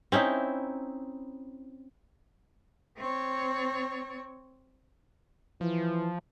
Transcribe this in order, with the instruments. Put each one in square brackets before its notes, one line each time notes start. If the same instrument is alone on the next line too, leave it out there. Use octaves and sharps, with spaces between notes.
[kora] C4 C#4 D#4 E4
[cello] C4 C#5
[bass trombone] E3 [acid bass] F3